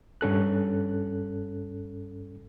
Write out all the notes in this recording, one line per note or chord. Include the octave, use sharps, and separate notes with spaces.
G2 C#4 A4 F#6